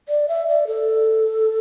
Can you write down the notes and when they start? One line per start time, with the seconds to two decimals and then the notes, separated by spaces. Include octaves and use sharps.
0.09 D5
0.28 E5
0.48 D5
0.67 A4